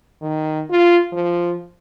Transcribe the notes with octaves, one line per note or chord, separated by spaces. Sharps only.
D#3
F4
F3